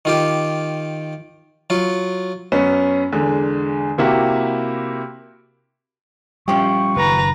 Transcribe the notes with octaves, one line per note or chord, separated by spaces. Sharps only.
D#3 F4 G4
F#3 F4
F#2 B3 C#4
E2 D3 G#3
C3 A#3 E4 F#4 G4
F#2 F3 G3 C#4 G4 C#6
F#1 D#3 B4 A#5